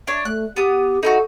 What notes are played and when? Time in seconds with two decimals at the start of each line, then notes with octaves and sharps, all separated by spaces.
0.07 D4 C#5
0.25 A3 F#6
0.56 B3 G4 D#6
1.03 D#4 E4 F#4 A4